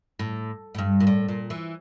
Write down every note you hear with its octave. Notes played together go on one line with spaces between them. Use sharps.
A2
A2
G2
A#2
A2
A#2
E3